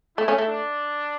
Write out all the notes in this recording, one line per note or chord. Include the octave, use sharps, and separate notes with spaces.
A3 E4
A3 C#4
A3
D4